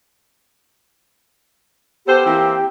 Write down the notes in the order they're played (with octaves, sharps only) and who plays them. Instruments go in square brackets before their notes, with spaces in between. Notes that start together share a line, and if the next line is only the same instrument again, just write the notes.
[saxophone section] B3 A4 C5 [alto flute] G4
[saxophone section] E3 A#3 C4